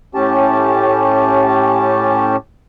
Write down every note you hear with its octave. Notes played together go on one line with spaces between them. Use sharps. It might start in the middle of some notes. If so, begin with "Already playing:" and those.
A2 C#4 G4 A5